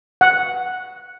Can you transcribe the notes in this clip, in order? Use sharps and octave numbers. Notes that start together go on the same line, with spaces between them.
F#5